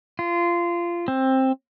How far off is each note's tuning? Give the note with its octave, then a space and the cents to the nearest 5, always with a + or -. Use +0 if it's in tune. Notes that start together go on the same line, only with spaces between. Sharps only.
F4 -20
C4 +15